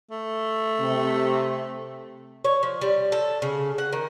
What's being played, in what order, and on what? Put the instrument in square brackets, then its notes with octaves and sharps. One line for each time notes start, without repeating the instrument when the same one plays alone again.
[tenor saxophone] A3
[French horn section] C3
[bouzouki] C#5
F3
G3
A4
C#3
F#5
D#3